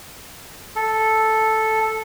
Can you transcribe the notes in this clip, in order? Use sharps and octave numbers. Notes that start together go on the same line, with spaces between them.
A4